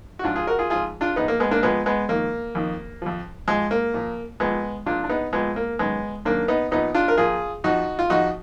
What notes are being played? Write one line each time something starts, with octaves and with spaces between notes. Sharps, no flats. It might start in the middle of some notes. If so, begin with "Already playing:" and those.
F#4
G#2 F3 D4 F4
F4 G#4
F#4 A#4
F4 G#4
G#2 F3 F4 G#4
D4 F4
A#2 F3 B3 D#4
A#3
G#3 B3
A#3 D4
A#2 F3 G#3 B3
G#3 B3
F2 D#3 A#3
F2 D#3
F2 F3
F2 F3 G#3
A#3
A#2 F3
A#2 F3 G#3 B3
A#2 F3 D4 F4
D4
B3 D#4
A#2 F3 G#3 B3
A#3
F#2 D#3 G#3 B3
F#2 D#3 A#3 D4
B3 D#4
A#2 F3 B3 D#4
D4 F4
A#4
A#2 F3 F4 G#4
F2 F3 D#4 F#4
F4
F2 F3 D#4 F#4